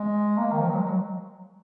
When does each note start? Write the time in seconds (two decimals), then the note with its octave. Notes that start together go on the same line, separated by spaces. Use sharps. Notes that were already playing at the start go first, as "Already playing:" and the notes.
Already playing: G#3
0.38 A#3
0.53 D#3
0.61 F3
0.70 F#3
0.76 G#3
0.84 F#3